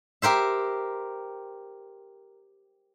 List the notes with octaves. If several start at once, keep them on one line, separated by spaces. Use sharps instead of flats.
G4 A#4 C5 E5